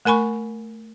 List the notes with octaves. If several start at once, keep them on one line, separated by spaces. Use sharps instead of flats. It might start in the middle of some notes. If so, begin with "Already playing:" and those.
A3 A#4 G#5 B5 C#6